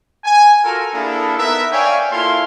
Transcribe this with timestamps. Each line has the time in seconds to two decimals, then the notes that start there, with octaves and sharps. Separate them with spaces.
0.25 G#5
0.64 F4 F#4 A4 A#4
0.93 A#3 D4 E4 G#4 A4
1.37 B3 D#4 A#4 B4 E5
1.72 C#5 D5 F5 G5 G#5
2.10 A#3 E4 F4 A4 F5 C6